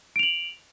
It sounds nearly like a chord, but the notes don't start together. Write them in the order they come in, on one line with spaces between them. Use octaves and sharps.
D7 F7 F#7